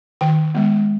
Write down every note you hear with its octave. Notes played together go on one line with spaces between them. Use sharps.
D#3 G5
G#3 B3